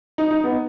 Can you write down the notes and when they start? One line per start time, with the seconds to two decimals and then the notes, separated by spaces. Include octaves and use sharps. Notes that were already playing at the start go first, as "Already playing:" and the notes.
0.18 D#4
0.31 D#4
0.44 B3